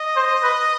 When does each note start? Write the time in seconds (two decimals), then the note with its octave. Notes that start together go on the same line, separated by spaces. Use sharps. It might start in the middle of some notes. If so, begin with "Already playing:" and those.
Already playing: D#5
0.16 C5
0.43 B4